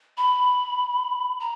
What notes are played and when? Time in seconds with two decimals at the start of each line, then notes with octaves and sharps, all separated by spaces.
0.17 B5
1.41 A#5